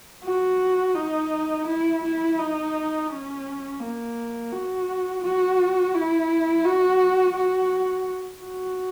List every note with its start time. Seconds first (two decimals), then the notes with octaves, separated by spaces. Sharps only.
0.24 F#4
0.95 D#4
1.67 E4
2.03 E4
2.39 D#4
3.10 C#4
3.80 A#3
4.52 F#4
5.23 F#4
5.94 E4
6.65 F#4
7.36 F#4
8.43 F#4